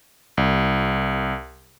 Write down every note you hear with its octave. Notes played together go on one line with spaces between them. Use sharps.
C2